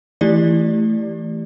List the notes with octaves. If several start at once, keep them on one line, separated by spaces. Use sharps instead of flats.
E3 A3 E4 G4 D5